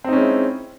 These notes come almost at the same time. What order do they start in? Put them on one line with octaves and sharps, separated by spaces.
C4 D#4 C#4 G#3 E4